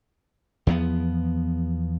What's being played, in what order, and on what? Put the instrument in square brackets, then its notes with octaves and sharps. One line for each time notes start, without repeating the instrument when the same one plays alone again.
[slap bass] E2 F3 B3